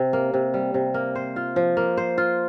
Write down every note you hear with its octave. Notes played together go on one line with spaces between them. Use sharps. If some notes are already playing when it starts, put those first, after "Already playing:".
Already playing: C3
A#3
C3
G3
C3
A#3
C5
F4
F3
A#3
C5
F4